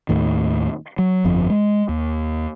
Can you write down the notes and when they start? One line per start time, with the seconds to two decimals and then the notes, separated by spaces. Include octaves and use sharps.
0.09 D#2 A2 D#3
0.99 F#3
1.24 G1 F2 F3
1.50 G#3
1.89 D#2